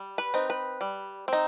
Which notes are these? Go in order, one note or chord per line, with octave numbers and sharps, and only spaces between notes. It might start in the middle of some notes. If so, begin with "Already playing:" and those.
Already playing: G3
B4
C4 D#4
B4
G3
C4 D#4